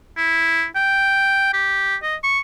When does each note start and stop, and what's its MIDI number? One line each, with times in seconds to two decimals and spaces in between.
0.17 0.66 64
0.75 1.53 79
1.53 1.96 67
2.03 2.16 75
2.23 2.40 85